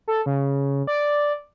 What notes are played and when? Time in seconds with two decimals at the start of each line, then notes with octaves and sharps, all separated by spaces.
0.08 A4
0.26 C#3
0.87 D5